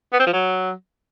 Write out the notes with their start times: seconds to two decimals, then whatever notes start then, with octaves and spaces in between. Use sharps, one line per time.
0.13 B3
0.20 C4
0.26 F3
0.33 F#3